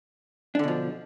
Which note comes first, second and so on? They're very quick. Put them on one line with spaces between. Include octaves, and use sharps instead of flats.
D4 D3 B2 F3